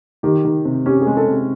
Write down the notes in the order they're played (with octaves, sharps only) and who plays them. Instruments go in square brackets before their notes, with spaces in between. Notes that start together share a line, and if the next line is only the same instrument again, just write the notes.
[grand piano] D#3 [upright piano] G4
[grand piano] D#3
C3
[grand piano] C#4 [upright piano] G4
[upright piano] G#4
[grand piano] G#3
[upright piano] A4
[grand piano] C3